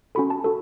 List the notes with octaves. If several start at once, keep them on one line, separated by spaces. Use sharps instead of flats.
C#4 F#4 A4 B5
A5
F#4 A4